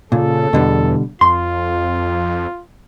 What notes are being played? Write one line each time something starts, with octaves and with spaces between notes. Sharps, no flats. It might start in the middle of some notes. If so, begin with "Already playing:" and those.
A#2 C#3 A4
E2 B2 D3 G3
F2 F4 C6